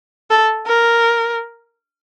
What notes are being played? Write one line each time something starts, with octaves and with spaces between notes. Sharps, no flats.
A4
A#4